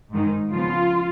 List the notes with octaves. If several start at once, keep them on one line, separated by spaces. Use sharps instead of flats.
G#2 D#3 G#3 D#4
C#3 F3 B3 F4